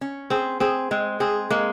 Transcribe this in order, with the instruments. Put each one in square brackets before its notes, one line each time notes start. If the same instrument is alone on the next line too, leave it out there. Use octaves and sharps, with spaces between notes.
[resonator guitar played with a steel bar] C#4
[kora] C4 [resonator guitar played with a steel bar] G#4
[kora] C4 [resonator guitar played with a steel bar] G#4
[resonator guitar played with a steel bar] G#3 [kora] C4
[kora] C4 [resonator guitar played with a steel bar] G#4
[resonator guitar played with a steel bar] G#3 [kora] A#3